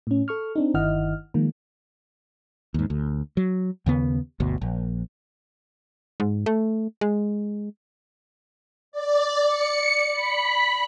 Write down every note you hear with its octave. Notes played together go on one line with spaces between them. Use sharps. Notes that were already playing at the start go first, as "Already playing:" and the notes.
A2 C#4
A4 C#6 F6
C4 D4 D#4
G1 D#3 E4 D#5 F#5 F6
D#3 F3 G#3 A#3
D#2 G#2
D2
F#3
D#2 C#3 B3
G1 D2 B2
A#1
G#2
A3
G#3
D5
C#7
B5